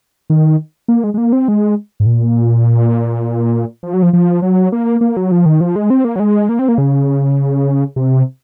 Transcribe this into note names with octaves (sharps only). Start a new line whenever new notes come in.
D#3
A#3
G#3
G#3
A#3
C4
G#3
G#2
A#2
F3
F#3
F3
F3
F#3
A#3
A#3
F#3
F3
D#3
F3
G#3
C4
A#3
F#3
G#3
A#3
C4
A#3
C#3
C3